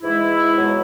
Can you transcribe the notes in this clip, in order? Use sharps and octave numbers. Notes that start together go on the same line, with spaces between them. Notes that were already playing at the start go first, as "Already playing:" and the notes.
G#2 E3 G#3 E4
B2 F#3 B3